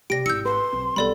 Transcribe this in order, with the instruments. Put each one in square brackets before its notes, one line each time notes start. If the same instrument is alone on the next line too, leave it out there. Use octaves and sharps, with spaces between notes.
[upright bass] C3 [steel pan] G4 D5 [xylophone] A#6 D7
[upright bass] G#1 E4 [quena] E6 [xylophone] G6 C#7
[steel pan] A4 B4 [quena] C6
[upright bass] B1 [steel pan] C4
[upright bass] B1 [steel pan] G3 B3 [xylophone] A4 D5 B5